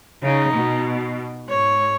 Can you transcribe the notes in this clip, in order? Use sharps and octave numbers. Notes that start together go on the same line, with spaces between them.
C#3 D#4
B2
G#2 C#5